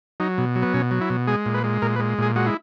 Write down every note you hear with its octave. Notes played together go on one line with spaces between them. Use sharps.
F#3 D#4
B2
F#3
B3
B2 C#4
F#3
E4
B2
G#3 G#4
A#2
B4
G#3
A#2 A#4
B4
G#3
A#2 G#4
G#3 F#4
E4